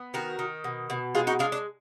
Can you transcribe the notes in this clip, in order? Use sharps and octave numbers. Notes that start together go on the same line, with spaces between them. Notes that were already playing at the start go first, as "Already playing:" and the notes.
Already playing: B3
D#3 F#4 A#4
D#3
B2
B2
G#3 F4 G#4
D#4 F#4
G#3 D4 F4
D4